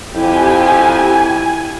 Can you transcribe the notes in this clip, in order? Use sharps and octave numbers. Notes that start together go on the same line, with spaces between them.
F2 E4 G4 G#5